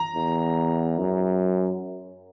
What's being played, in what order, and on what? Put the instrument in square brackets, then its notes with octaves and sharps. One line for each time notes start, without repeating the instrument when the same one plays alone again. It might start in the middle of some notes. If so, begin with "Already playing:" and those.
Already playing: [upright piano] A#5
[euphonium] E2
F#2